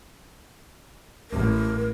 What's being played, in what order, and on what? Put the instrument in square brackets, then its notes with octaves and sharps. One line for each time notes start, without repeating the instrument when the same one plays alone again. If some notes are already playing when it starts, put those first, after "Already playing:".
[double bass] A1 G#3 [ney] A#4